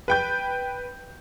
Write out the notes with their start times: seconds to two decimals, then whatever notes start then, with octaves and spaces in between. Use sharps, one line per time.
0.08 B4 G5 G6